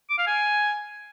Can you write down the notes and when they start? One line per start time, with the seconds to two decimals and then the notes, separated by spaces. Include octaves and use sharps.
0.10 D6
0.18 F5
0.27 G#5